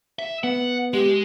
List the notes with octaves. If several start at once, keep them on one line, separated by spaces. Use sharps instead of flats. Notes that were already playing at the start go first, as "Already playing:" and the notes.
E5
B3 F#5
G#3 G4